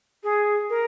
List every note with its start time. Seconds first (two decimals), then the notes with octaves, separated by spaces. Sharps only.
0.23 G#4
0.69 A#4